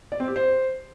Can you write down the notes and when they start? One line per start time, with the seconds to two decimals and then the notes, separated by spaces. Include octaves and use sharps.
0.12 D5
0.20 C4
0.28 G4
0.36 C5